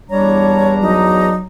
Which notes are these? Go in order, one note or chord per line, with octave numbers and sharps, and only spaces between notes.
E2 G3 D4 C#5 A#5
F#3 D#4